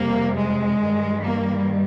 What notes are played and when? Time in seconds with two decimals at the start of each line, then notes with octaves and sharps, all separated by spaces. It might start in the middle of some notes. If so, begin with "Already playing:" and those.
Already playing: F2 C3 G3 A#3
0.37 G#3
0.80 G2 D#3 G3
1.24 A#3